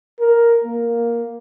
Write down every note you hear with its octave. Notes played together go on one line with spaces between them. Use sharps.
A#4
A#3